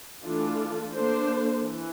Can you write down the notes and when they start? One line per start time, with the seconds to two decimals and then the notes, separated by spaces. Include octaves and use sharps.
0.24 E3 A3 D4 F4 A4
0.94 A#3 D4 A4 C5
1.62 E3